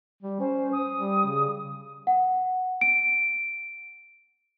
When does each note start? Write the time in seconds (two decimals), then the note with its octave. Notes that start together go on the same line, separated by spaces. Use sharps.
0.23 G3
0.40 C#4 C5
0.72 D#6
0.96 G3
1.26 C#3
2.07 F#5
2.81 D7